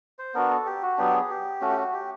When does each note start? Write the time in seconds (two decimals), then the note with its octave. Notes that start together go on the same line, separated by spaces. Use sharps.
0.19 C5
0.34 B3 D4 F#4 A#4
0.50 A4
0.66 G4
0.82 F#4
0.98 F#3 B3 D4 G4
1.14 G#4
1.30 G4
1.61 A3 C#4 F#4
1.69 G4
1.77 F#4
1.94 G4